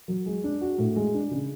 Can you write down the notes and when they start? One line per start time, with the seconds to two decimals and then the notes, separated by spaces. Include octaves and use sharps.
0.08 F#3
0.26 G#3
0.44 D4
0.61 F#4
0.78 A2
0.96 G#3
1.14 D4
1.31 C#3